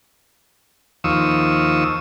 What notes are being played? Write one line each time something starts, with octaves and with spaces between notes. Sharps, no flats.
D#2 F3 C#6 D#6 E6